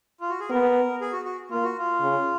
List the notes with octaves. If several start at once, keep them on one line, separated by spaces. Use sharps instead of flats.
F4
F#4
G#4
B3 A#4
G#4
F#4
F#4
A#3 F4
F#4
F4
C#3